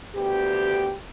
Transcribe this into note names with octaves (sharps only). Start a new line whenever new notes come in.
D2 B3 G4